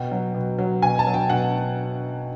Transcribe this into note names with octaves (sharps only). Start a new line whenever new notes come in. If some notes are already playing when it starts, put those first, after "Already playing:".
Already playing: B2 G5
F#3
B2
F#3
B2 G#5
A5
F#3
G5
B2 F#5